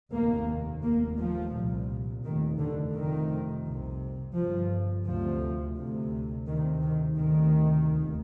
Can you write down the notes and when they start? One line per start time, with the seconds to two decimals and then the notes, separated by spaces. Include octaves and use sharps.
0.13 F1 D#2 A#3
0.84 F1 D#2 A#3
1.19 F3
1.54 C2 A#2
2.24 F1 D#2 D#3
2.60 D3
2.95 F1 F2 C3 D#3
3.65 C2 C3
4.35 G1 G2 F3
5.05 D2 C3 F3
5.76 D2 C3
6.46 D2 C3 D#3
6.81 D#3
7.17 D2 C3 D#3
7.87 F1 D#2